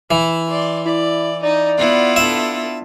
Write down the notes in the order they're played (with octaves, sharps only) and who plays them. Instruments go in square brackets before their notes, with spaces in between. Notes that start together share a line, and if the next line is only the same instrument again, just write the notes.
[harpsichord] E3 [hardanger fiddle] E4
[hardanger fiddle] D5 C6
[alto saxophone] E4 [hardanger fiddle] D5
[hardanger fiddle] D#4 [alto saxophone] D5
[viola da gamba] B3 E4 F4 [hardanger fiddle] F#5
[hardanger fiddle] D4 A4 [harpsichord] E5